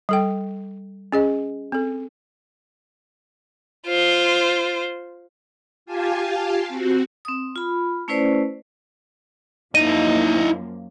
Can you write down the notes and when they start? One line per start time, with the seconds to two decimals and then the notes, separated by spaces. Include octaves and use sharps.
0.09 G3 A4 G5
1.12 C#4 G#4 D#5
1.72 C4 A4
3.87 F4 C5
5.86 F4 G4 F5 G#5 A5
6.68 C4 F#4
7.25 C4 D#6
7.56 F4 B5
8.08 A3 C#4 E4 B4 C5 D5
9.75 F#2 F3 A#3 D#4 E4 D#5 D#7